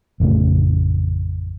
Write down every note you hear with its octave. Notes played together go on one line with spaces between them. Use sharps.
A1 F2 C#3 A3